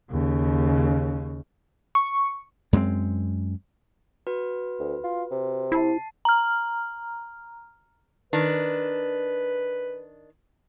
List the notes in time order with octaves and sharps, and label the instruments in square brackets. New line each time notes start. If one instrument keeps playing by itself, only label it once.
[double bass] D#2 C#3
[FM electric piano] C#6
[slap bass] F#2 G#3 B3 C4
[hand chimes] F#4 B4
[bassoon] D2
F4
C3
[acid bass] E4 [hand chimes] A5 C7
[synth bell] A#5 F6
[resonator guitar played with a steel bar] D#3 D4 [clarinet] B4